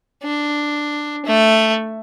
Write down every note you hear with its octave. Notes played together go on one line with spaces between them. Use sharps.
D4
A3